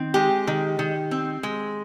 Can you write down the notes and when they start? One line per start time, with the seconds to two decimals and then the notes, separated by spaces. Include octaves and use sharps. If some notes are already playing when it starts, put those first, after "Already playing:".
Already playing: D#3 C4
0.14 G#3 G4
0.47 D#3
0.79 D#3
1.11 C4
1.43 G#3